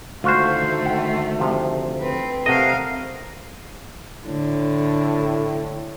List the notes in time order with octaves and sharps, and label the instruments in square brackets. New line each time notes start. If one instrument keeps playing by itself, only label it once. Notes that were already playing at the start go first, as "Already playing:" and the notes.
[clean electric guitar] D2 C5 [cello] D#3 A3 [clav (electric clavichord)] F4 F#4
[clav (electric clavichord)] F#5 G5
C3 F3
[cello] C4 B4
[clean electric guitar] C3 D#5 [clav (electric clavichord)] A3 F#5 [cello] A#4 F5
[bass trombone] A2 [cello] D3